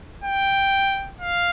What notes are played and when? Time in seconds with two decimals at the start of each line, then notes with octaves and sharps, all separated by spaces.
0.24 G5
1.21 F5